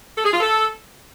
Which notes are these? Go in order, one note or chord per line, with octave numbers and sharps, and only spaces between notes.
A4
G#4
F4
A4